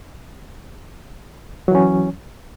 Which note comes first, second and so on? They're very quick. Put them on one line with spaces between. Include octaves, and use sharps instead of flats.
F#3 E3 C#4